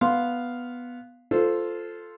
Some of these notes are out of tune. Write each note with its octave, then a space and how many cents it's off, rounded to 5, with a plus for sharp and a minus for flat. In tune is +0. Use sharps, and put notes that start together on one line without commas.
B3 +0 F5 +0 C6 +0
F4 +0 A4 +0 C5 -15